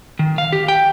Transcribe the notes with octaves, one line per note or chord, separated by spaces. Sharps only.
D#3
F5
G4
G5